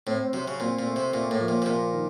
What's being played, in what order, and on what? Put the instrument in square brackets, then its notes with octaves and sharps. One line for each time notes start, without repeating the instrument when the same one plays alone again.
[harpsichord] A2 [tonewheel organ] C4
[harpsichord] C3 [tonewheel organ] F#3
[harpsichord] C#3
[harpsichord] A#2 [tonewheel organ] C4
[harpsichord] A#2
[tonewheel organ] A3
[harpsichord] C3
[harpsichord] A#2 [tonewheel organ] A#3
[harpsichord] A2
[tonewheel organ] F3
[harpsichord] A#2
C3
[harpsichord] A#2 [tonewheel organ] A#3
[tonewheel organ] D#3